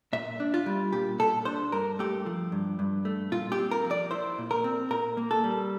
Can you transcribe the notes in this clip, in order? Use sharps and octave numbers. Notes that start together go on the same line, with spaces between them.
A#2 E5
D4
F4
G3
A#2 G4
A#2 A4
D4 C5
G2 A#4
A3 G4
F3
G2
G2
A3
A#2 F4
G4
C4
A#4
F3
D5
E4 C5
A#2
A#4
C4
A#2 A#4
A#3
A4
G3